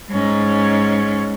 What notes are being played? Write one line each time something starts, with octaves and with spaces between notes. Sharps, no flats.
G#2 C#4